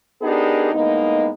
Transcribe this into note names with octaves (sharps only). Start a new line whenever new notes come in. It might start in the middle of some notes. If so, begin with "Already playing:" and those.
B3 D4 D#4 G4 G#4 A#4
A2 G#3 A#3 B3 D#4